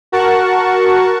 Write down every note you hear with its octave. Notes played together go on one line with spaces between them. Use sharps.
F#4 A#4 F#5 A5 C#6